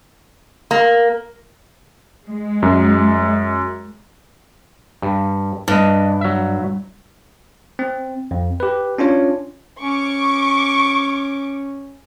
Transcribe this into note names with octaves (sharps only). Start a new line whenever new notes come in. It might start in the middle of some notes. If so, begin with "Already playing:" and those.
A#3
G#3
F#2
G2
G2 D4 D#5
F#3 E5
C4
F2
G4 B4
C#4 D4 F4 C#5
C#4 C#6 D6